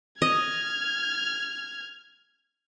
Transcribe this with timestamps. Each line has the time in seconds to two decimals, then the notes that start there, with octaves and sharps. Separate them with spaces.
0.22 D#5 F6 G#6